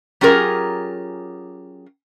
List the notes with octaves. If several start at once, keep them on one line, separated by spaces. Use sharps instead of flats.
F#3 C#4 F4 G4 G#4 A#4